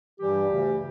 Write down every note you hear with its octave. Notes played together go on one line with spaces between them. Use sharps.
G2 E3 G3 G4
D2 C#3 E3